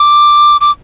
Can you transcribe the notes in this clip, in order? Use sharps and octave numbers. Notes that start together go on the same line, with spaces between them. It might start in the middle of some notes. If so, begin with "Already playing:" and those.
Already playing: D6
D6